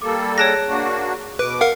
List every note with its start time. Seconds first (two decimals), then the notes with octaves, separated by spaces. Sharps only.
0.02 G3 A#3 A4 D6
0.38 G#4 C#5 A5 F#6 A#6 D7
0.69 A#3 D4 F#4
1.39 B2 B4 D6
1.61 A#4 F5 F#5